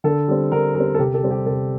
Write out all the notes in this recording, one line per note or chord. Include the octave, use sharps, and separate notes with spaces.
D3 A4
G3 C4
D3 A#4
G3 C4 A#4
A4
C3 G4
A4
G3 C4
G4
C3 A4